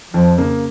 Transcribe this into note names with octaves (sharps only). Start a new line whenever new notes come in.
F2 F3
C#3 A#3